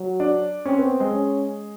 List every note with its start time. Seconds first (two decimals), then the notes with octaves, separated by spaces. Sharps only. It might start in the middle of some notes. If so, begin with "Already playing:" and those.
Already playing: F#3
0.20 D4
0.65 C4 C#4
0.78 B3
1.00 G#3
1.12 C#4